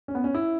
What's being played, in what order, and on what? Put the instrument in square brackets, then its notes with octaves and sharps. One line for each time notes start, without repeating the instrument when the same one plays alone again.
[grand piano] C#4
B3
C#4
E4